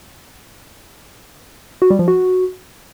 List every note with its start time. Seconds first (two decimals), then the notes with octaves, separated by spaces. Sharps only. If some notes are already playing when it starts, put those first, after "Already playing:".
1.82 F#4
1.90 G3
1.99 F3
2.08 F#4